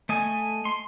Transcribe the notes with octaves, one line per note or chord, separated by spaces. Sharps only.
A3 D#5 G#5
C6